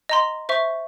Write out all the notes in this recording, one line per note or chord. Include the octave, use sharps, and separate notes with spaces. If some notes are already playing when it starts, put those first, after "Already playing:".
D#5 A#5 C6
C5 E5 C#6